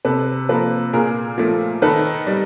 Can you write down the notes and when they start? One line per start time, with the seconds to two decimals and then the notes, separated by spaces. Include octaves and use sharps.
0.05 C3 A4 B4
0.49 F3 A#3 A4 B4
0.93 A#2 G#4 A#4
1.38 F3 A3
1.82 D#3 A4 B4
2.27 G3